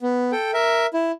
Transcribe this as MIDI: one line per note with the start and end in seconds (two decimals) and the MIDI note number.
0.02 0.31 59
0.32 0.51 69
0.32 0.51 79
0.53 0.87 70
0.53 0.87 76
0.94 1.11 64